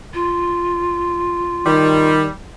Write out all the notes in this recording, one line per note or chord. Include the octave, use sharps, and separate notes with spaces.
F4
D#3 G3